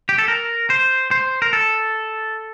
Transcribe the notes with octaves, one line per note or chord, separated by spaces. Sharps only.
G4
A4
A#4
C5
C5
A#4
A4